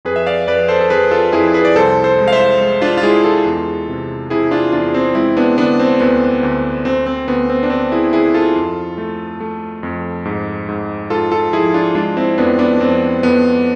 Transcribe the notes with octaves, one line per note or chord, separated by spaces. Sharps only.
F2 G#4 B4
E5
D5 F5
F2 B4 D5
A4 C5
A4
F2 G#4 B4
F4 A4
F2 E4 G#4
G#4 B4
D5
C2 A4 C5
A4 C5
G#3
F5
C5 E5
G#3
D4 F4
F4
G#3 E4 G#4
F4 A4
E2
C3
C3 E4 G#4
D4 F4
E2 D4 F4
C4
G#3 C4 E4
B3 D4
D3 B3 D4
C4
D2 B3
D2
D2 C4
C4
D2 B3
C4
D4
D2 C4
E4 G#4
D2 E4 G#4
F4 A4
F2
A3
A3
F2
G#2
G#2
G#2 F4 A4
F4 A4
F3 E4 G#4
D4 F4
G#3 D4 F4
C4 E4
F2 B3 D4
B3 D4
F2 C4
F2 B3